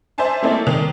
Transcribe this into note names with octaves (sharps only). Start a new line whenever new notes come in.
C5 D5 E5 G#5 A5 C6
A3 A#3 C4 E4 A4 D5
D#3